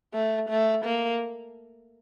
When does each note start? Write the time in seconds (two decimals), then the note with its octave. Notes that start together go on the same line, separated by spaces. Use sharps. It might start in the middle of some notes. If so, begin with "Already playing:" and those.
0.14 A3
0.49 A3
0.85 A#3